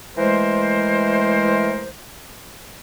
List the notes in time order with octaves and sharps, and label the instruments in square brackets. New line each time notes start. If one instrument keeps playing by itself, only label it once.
[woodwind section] E3 G#3 A3 A#4 C5